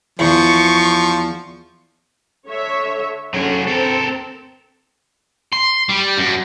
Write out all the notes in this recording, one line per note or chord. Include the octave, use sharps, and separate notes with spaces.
E2 F3 C#6
D3 C#5 E5
D3 F#3 C#4 G#4
C4 A4 A#4
C6
G3
F#2